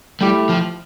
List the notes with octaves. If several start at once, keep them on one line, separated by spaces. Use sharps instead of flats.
G3 A3 E4 G4
F3